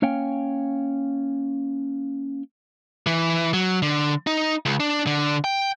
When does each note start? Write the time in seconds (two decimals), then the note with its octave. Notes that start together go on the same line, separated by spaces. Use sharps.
0.02 A#3 C#4 C#5 F5 G5 G#5
3.06 E3
3.53 F#3
3.82 D3
4.27 D#4
4.66 C#2
4.80 D4
5.07 D3
5.44 G5